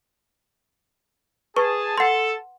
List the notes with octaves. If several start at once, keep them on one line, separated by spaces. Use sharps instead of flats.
G#4 B4 A5 C#6
A4 F#5 C6